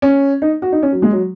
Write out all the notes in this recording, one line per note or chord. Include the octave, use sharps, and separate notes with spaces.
C#4
D#4
F#4
D#4
C#4
F#3
G#3
F#3